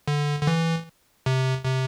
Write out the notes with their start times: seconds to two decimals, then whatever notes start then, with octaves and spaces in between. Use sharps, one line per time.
0.08 D3
0.42 D3
0.47 E3
1.26 C3
1.65 C3